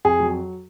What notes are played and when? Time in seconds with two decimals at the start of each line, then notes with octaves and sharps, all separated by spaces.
0.05 F2 G#4
0.20 F#3